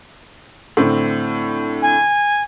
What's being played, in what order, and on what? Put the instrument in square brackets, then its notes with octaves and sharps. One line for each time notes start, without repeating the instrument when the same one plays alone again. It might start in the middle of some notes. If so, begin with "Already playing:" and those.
[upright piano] A2 D3 C4
[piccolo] G#5